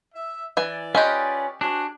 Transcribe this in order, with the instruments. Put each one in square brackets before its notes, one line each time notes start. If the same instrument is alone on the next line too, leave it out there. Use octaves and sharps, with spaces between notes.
[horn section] E5
[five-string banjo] E3 G#5 [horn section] D5
[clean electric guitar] C#4 F4 B4 [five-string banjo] G4 D#5 G#5
[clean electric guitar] D4 [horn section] F#4 G#4 C5